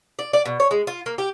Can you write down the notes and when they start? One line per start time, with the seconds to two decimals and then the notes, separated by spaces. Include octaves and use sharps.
0.19 D5
0.33 D5
0.46 B2
0.60 C#5
0.71 G#3
0.87 F4
1.06 A#3
1.18 G4